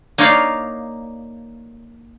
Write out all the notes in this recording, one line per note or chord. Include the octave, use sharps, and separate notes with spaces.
A#3 D#4 C#5 D5 F5